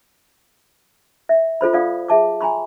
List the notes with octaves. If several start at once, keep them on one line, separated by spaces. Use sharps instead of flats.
E5
F4 A4 C5 B5
F4 A4 D5 F5 F#5 D#6
G#4 E5 A5 D6
G#5 A#5 B5 C#6